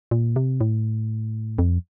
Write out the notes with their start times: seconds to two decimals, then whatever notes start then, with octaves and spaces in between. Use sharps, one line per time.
0.11 A#2
0.36 C3
0.61 A2
1.59 F2